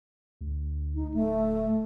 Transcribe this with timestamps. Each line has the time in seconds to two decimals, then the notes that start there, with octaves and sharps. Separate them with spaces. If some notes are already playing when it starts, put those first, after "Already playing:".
0.41 D2
0.95 D#4
1.14 D1 A3